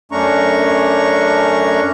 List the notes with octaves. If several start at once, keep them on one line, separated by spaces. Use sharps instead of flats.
F#2 A3 C#4 D4 A#5 C#6